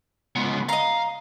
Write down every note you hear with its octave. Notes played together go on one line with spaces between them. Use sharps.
C#2 B3
D#5 F5 A#5